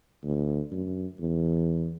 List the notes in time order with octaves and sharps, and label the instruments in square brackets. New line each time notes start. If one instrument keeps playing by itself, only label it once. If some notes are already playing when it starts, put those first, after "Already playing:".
[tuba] D2
F#2
E2